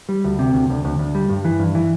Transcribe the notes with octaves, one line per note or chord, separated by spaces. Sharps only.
G3
D2
C3
D2
D2
D2
D2
G3
G2
E3
G2
E3